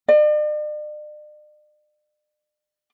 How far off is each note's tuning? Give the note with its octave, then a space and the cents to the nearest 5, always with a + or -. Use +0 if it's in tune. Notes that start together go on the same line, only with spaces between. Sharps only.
D5 +45